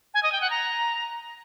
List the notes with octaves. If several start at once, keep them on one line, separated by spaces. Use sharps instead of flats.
G#5
D#5
G5
F#5
A#5